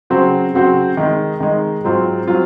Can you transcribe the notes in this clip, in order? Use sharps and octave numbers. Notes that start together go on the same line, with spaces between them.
C#3 F#3 C4 F#4 C5
C#3 F#3 C4 F#4 C5
D#3 G#3 D#4
D#3 G#3 D#4
G#2 F#3 C4 F4
F#3 C4 F4